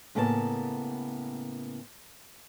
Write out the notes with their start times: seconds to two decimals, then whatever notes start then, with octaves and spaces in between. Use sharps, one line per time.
0.15 A2 C#3 A#3 B3 D5 A5